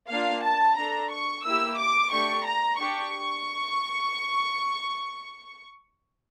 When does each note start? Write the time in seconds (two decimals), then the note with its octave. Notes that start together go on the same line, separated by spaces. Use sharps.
0.10 A#3 D4 F4 F5
0.43 A5
0.77 D4 A4 A#5
1.11 C#6
1.45 A#3 E4 G4 E6
1.78 D6
2.12 A3 D4 G4 C#6
2.46 A#5
2.79 D4 G4 C#6